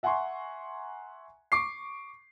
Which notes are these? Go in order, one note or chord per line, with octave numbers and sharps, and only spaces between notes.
E5 F#5 G#5 A#5 C6 C#6
C#6 D6 C7